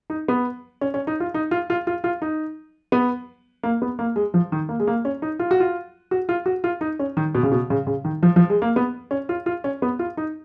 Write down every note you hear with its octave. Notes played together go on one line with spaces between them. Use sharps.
D#4
B3
C#4
C#4
D#4
F4
D#4
F4
F4
F4
F4
D#4
B3
A#3
B3
A#3
G#3
F3
D#3
A#3
G#3
A#3
C#4
D#4
F4
F#4
F4
F#4
F4
F#4
F4
D#4
C#4
D#3
B2
C#3
B2
C#3
C#3
D#3
F3
F3
G#3
A#3
B3
C#4
F4
F4
C#4
B3
F4
D#4